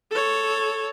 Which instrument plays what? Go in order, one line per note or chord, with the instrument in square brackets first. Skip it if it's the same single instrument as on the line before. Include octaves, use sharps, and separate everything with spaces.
[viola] A4 C#5